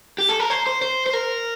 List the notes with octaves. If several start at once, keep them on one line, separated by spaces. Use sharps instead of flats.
G4
A4
A#4
C5
C5
C5
C5
A#4